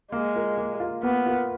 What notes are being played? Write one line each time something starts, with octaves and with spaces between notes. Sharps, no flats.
G#3 A#3
F4 A#4
A#3
F4 A#4
A#3 B3
F4 A#4